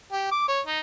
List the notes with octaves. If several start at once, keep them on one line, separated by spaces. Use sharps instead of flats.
G4
D6
C#5
D#4